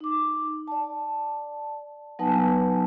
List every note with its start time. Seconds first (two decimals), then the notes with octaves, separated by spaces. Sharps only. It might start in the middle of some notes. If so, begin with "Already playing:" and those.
0.01 D#4 D6
0.67 D5 A5
2.19 F#3 B3 D#4 B4 G#5 A5